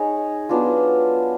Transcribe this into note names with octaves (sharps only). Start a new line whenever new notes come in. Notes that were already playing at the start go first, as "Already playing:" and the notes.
Already playing: D#4 G#4 C#5
F#3 B3 D4 F4